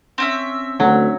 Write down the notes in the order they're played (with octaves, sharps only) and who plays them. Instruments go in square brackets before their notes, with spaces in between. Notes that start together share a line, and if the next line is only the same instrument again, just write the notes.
[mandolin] C4 C#4 E5
[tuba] D2 [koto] F#3